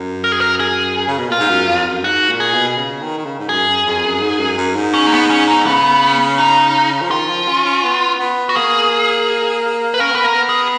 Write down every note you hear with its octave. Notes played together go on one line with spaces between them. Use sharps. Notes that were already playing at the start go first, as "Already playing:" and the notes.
Already playing: F#2
A#4
G#4
A#4
G#4
C#3
B2
A#2 F4
G#2
F#2
F2
F#2
G#2 F#4
A#2
G#4
B2
C#3
D#3
D#3
C#3
G#2
F#2 G#4
F#2
F2
F#2
G#2
F#2
F#2
G#2
C#4
A#3
B3
C#4
D#4
C#3 B3
D#4
F3
D#3 F4
F3
C#4
C#4
B3
B3
F#4
A#3 G#4
B4
C#4 A#4
B3 B4
A#3 A#4
B3
G#4